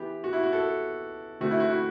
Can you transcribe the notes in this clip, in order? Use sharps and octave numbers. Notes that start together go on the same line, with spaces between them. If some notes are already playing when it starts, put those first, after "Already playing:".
Already playing: E3 B3 G4
F#4
E4
F#4
A4
D3 A3 C4 F#4
E4
F#4
E4